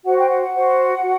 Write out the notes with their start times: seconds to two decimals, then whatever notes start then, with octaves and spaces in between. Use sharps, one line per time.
0.05 F#4 C5 F#5
0.17 G5
0.28 F#5
0.41 F#5
0.53 F#4 C5
1.01 F#4